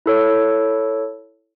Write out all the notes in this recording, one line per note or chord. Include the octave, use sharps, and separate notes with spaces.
E4 A4 C#5